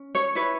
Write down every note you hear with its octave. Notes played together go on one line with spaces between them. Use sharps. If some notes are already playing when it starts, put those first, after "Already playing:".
Already playing: C#4
C#5
E4 B4 C#5